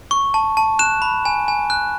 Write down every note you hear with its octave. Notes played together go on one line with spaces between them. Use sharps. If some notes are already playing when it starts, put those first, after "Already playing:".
C#6
A5
A5
F#6 E7
B5
G#5
G#5
F#6